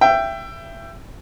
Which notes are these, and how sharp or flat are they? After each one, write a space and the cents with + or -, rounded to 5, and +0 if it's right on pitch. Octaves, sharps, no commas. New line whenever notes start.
E5 +25 G5 +0